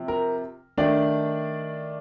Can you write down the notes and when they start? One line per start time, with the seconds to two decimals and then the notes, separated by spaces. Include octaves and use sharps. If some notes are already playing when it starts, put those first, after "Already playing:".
Already playing: C3 F3
0.08 A#4
0.77 D#3 A3 D4 D5